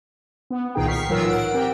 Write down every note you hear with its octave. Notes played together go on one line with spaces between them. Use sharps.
B3
C2 A#2 D#3 D#4 G#4 G5
C#6 F6 B6 C7
A2 E3 F#3 F4 A#4 E6
F#5 D7
C4 G4 A#4 G5